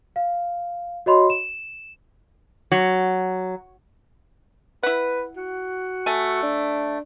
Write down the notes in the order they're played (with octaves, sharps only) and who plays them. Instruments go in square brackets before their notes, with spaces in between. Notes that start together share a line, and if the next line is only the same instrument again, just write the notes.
[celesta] F5
F#4 C#5 D#5 B5 C6
E7
[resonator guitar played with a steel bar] F#3
[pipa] E4 F#5 [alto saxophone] B4
[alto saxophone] F#4
[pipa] A3 G#5
[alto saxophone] D4